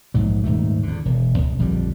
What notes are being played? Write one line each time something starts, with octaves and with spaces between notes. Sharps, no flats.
A#1 G#2 F#3
D#1 G#2 A3
E2 D3
E1
C#2
A#1 F2 D3 G3